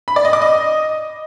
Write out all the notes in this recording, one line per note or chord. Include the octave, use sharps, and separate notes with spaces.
B5
D5
D#5
D6
D#5